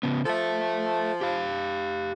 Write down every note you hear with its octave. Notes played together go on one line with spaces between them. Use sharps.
C#3 B3
F3 A4 E5
G4 F5